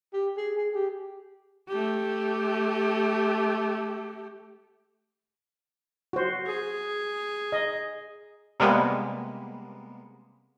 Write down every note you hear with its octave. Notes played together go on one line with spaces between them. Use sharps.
G4
G#4
G#4
G4
A3 G4
F#4 C5
G#4
D#5
C3 G3 G#3 A#3 B3